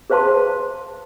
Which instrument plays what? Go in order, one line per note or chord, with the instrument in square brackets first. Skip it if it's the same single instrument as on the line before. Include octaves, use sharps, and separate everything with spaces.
[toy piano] G#4 B4 C5 F5 A5 C6